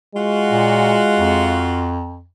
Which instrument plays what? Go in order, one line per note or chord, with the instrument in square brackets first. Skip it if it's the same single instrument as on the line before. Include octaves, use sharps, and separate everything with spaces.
[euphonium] G#3 [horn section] F4 F#4
[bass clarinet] A#2
F2